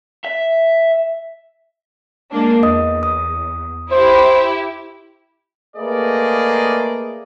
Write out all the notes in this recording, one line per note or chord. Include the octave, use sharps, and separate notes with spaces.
E5
G#3 A#3 D4
E2 D#5 D#6
D#6
E4 G4 C5
A3 A#3 G#4 B4 D5 D#5